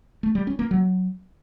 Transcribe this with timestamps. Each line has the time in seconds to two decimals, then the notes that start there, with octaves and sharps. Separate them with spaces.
0.23 A3
0.35 G3
0.47 C#4
0.59 A#3
0.71 F#3